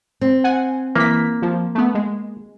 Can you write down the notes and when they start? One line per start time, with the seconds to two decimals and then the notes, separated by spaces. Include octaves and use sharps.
0.21 C4
0.44 F#5 G#5
0.95 E3 A#3 B6
1.42 F3
1.75 A3 B3
1.95 G#3